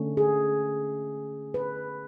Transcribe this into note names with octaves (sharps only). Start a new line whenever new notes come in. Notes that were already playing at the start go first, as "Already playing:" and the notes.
Already playing: D3 A3 C#4
G#4
B4